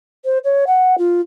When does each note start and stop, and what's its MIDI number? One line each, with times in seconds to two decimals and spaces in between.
0.25 0.38 72
0.44 0.64 73
0.67 0.96 78
0.98 1.21 65